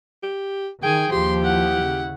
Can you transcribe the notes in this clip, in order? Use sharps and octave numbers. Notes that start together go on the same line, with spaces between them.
G4
D#3 G#4 G5 G#5
D#2 F3 G4 C6
E4 F#5
C#3